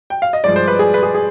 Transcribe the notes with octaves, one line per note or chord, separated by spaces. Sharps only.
G5
F5
D#5
G2 F3 G#3 D5
C5
B4
G#4
B4
G#4
G#4